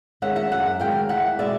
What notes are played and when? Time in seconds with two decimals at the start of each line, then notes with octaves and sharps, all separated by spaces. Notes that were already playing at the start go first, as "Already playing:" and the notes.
0.22 D#3 G#3 C#4 E5 F#5
0.36 E5 F#5
0.51 F#2 E5 F#5
0.80 D#3 G#3 C#4 F5 G5
1.09 E2 E5 F#5
1.39 B2 G#3 D5 E5